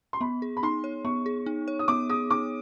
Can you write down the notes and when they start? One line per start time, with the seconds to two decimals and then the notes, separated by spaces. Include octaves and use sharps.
0.13 C6
0.21 B3 B5
0.42 G#4
0.57 B5
0.63 D#4 C6
0.84 C#5
1.05 B3 C#6
1.26 G#4
1.46 D#4
1.68 C#5
1.79 D#6
1.88 B3 D6
2.09 G#4 D#6
2.30 D#4 D6